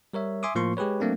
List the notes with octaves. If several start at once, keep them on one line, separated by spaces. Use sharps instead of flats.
G3 A#4 C#5 E5
E5 G#5 C6 D6 D#6
A2 F3 A#3 C6 C#6
G#3 G4 G#4 B4 C#5
F#3 A3 A#3 C4 D4